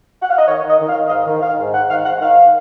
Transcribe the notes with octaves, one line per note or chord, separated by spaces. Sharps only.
F#5
F5
D#5
D#3 C#5
D#3 D#5
D#3
F5
D#3
D#5
G#2 F5
D#3
D#3 F5
G#2
G#2 F#5
D#3 F5
G#2 F#5
D#3 F5